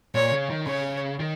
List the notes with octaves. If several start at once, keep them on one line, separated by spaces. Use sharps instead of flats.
A#2 C#5
C#3
D#3
C#3 C#5
D#3